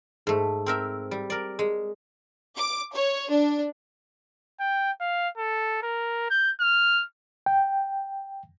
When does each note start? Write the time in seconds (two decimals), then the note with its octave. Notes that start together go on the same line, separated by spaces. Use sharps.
0.27 G#2 A3
0.66 C4 A#4 E5
1.11 G3
1.30 A#4 D5
1.59 G#3
2.56 D6
2.92 C#5
3.29 D4
4.60 G5
5.01 F5
5.37 A4
5.82 A#4
6.30 G6
6.61 F6
7.46 G5